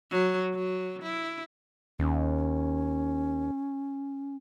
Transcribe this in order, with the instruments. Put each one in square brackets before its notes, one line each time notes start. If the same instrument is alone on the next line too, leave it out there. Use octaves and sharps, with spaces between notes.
[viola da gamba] F#3
F#3
E4
[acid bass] D#2 [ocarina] C#4